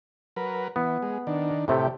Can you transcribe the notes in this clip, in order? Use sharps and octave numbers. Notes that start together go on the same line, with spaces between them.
F#3 A#4 B4
E3 B3
G#3
D#3 D4
A2 C3 A3 G4